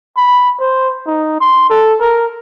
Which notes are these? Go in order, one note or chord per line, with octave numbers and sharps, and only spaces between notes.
B5
C5
D#4
C6
A4
A#4